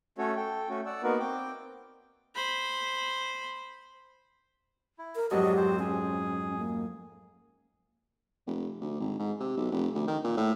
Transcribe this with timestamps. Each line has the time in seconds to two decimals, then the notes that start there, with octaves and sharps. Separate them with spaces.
0.18 A3 C#4 F#4 A4 C#5
0.36 A4 G5
0.69 A3 C#4 F#4 A4
0.86 D5 F#5 E6
1.03 A#3 B3 D#4 F#4 A#4 B4
1.19 C4 G5 D6
2.35 C5 B5
4.99 E4
5.16 A#4
5.31 F2 G#2 F#3 D4 F#4 G4 D#5
5.57 C4 C5
5.79 C#4 G#4
6.58 A#3
8.47 F1
8.81 D2
9.00 G#1
9.19 G#2
9.40 C3
9.57 B1
9.72 F1
9.95 D2
10.08 D#3
10.24 A#2
10.37 A2